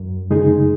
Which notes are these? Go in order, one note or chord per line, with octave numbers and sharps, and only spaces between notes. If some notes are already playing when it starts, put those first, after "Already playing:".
Already playing: F#2
C#3 G#3 D#4 G#4